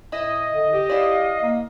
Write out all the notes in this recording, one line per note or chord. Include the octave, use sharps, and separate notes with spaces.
A2 E4 D#5
D3
G4
E4 D5 F5
A#3